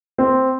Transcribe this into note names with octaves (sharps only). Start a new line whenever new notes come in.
C4